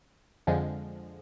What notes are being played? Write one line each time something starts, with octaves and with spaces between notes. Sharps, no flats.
F2 D3 F3 G#3